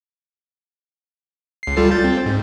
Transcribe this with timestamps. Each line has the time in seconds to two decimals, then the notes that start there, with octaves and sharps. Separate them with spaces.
1.63 C#2 C7
1.77 G3 F4 A4
1.91 G6 A6
2.04 C4
2.26 G#2